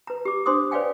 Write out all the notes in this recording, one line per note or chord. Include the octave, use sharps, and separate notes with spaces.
B4 A#5
G4 D6
D4 C5 C6 D6 D#6
B4 C#5 D5 F5 G5 G#5